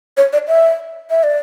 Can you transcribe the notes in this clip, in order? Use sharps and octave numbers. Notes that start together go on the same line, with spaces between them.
C#5
D5
E5
E5
D5